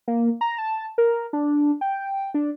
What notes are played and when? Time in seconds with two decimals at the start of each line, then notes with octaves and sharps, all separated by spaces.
0.08 A#3
0.41 A#5
0.58 A5
0.98 A#4
1.33 D4
1.81 G5
2.34 D4